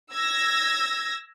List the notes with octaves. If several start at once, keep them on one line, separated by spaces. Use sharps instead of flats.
E6 G#6 A#6